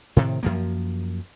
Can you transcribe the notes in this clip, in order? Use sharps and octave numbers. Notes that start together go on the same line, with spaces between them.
A2 C3 D#3
F#2 F3 A#3